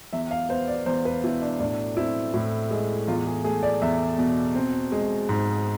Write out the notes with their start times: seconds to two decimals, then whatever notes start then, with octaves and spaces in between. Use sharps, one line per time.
0.13 E2 E5
0.31 F5
0.49 B3 C5
0.68 D5
0.86 E2 C5
1.05 B4
1.24 B2 E4
1.42 D4
1.60 A2 D4
1.97 C4 E4
2.34 A2 E4
2.71 G#3
3.07 E2 F4
3.26 G#4
3.44 A3 G#4
3.63 D5
3.82 E2 E5
4.18 B2
4.55 C4
4.92 G#3
5.29 G#2